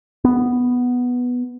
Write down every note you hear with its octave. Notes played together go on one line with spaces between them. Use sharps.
B3